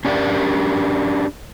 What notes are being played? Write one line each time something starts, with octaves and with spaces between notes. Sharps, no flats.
C#4 D4 G4 A#4 D5